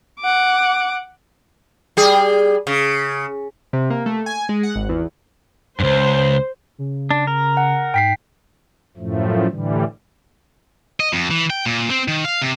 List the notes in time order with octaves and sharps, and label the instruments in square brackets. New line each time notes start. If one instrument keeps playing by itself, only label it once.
[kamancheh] F#5 D6
[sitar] G3 G#4
C#3
[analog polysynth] C3
A#3
A3
G#5
G#3
F#5
G#1
E2
[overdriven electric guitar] C#2 G2 [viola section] C5
[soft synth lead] C#3
[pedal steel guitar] D4
A#4
[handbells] F#5
[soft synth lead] G#2 [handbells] G5 B6 C7
[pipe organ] F#2 A2 F3 A3
A2 D3 E3 G3
[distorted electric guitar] D#5
F2
E3
G5
A#2
C4
D#3
F5
C3